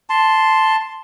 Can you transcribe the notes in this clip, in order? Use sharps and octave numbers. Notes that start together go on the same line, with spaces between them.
A5 C6